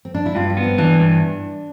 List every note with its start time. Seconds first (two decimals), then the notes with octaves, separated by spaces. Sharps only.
0.05 C4
0.14 D4
0.26 E4
0.35 G2 F4
0.50 D4
0.57 B3
0.64 C4
0.78 E3 D4
1.00 G2